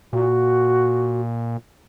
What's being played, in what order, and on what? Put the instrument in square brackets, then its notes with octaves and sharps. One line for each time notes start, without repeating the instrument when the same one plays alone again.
[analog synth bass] A#2 [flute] F#4